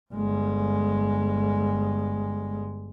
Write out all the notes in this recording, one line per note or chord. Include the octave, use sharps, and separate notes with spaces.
G1 G#3